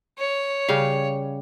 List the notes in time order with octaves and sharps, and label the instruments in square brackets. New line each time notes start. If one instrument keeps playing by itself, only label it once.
[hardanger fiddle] C#5
[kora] C#3 G3 F5